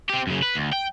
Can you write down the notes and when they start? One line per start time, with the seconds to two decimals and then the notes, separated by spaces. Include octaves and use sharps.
0.09 C4 G4
0.27 F#2 C#3
0.42 B4
0.55 D2
0.72 G5